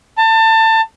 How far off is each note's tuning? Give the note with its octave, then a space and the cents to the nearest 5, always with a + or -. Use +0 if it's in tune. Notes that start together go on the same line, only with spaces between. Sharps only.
A5 +25